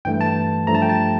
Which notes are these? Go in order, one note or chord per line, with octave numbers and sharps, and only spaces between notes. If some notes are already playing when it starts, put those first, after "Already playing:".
G2 E3 A3 G5
A5
G2 F3 A3 A#5
A5
G5
A5